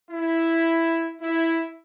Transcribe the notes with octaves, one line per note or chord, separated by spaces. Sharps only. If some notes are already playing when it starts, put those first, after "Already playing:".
E4
E4